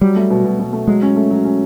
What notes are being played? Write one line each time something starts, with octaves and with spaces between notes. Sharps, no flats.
F#3 G3
A3
B2
B2
B2
A3
F#3 G#3
C#4
A3
F#3
C#4